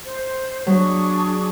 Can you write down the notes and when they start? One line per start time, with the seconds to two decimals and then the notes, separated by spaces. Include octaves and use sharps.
0.04 C5
0.67 F#3 D4 G#4 C#6